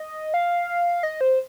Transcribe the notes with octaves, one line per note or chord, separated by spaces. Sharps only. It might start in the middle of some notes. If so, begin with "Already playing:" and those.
Already playing: D#5
F5
D#5
C5